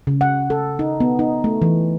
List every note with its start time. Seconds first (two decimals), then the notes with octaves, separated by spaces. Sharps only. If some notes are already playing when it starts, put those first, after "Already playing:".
0.07 C#3
0.21 F#5
0.50 A4
0.79 D#4
1.00 B3
1.19 D#4
1.44 A3
1.62 E3